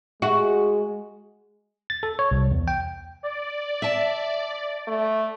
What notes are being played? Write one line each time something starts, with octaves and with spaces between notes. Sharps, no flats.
G#3 F#4
A6
A4
C#5
C2
E2
G5
D5
E5 A5
A3